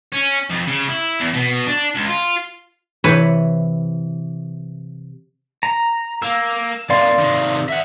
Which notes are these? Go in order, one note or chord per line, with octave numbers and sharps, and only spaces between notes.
C#4
F2
C#3
E4
E2
B2
D4
C#2
F4
C3 E3 B4 C#5
A#5
A#3 E6
C3 A#3 D5 F5 C6
C3 D#3
E5 F#5